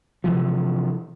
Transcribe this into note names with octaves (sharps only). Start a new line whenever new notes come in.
C3 E3 F3